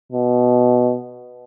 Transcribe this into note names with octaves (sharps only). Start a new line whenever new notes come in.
B2